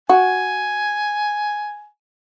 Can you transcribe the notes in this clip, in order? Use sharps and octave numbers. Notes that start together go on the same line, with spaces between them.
F#4 G#5